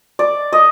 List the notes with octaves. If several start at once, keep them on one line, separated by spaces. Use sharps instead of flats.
D5
D#5